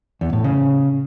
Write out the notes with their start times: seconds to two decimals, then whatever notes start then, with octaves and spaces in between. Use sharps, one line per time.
0.21 E2
0.33 A2
0.44 C#3